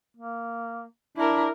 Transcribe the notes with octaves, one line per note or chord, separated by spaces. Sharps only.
A#3
D4 E4 A#4